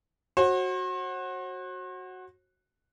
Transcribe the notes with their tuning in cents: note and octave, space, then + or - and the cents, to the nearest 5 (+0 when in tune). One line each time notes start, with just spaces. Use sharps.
F#4 +0 C5 +45